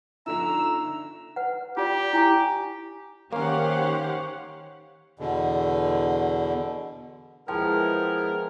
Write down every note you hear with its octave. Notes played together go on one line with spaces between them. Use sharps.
G1 D3 F3 D4 D#4 E5 A#5 E6
B4 F#5
F4 G4 D5
E4 G#5 C#6
D#3 A#3 C#4 G4 C5 C#5 F5 F#5
E2 B2 D3
F3 G#3 B3 E4 G#4 A#4 G5